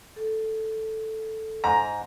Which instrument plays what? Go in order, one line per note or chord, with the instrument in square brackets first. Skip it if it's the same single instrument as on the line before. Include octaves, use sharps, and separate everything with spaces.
[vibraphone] A4
[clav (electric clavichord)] G#2 [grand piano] A#5